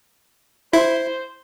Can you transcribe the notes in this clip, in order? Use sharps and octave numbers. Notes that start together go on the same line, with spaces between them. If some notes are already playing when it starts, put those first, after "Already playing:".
E4 C5